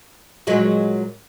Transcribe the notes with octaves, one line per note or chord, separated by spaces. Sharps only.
A#2 F#3 G#3